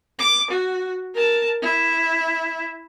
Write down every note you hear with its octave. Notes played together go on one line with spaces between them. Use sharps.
D6
F#4
A#4 A5
E4